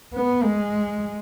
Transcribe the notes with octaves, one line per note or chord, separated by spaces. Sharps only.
B3
G#3